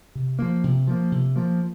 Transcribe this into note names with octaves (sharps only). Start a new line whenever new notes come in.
C3
F3 A#3
C3
F3 A#3
C3
F3 A#3